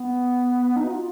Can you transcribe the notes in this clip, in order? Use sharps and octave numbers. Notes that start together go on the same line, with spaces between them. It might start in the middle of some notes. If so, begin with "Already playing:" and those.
Already playing: B3
D#4
F#4
F4